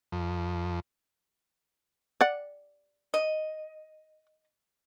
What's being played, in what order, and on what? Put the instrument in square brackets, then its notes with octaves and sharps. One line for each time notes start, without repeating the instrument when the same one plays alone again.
[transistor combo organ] F2
[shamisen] D5 F#5
[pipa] D#5